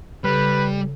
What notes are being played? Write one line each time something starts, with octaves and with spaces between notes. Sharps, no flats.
C#3 G3 A4 B4